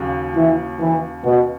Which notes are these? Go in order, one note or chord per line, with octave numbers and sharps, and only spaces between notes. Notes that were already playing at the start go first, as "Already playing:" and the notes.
Already playing: D#2 C#3 F#3
E3
E3
B2